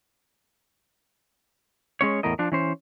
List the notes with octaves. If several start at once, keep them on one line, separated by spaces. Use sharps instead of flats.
G#3 C#4 C#5
E2 A2 A#4 D#5
F3 D4
E3 C#4 C5